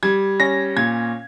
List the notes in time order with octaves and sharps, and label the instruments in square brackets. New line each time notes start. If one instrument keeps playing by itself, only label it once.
[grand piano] G3 G#6
C#4 A#6
A#2 G#6